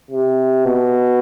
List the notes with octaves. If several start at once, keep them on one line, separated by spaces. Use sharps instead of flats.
C3
B2